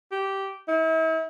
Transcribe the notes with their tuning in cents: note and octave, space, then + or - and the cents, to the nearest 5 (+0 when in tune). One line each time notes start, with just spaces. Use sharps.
G4 -10
E4 -40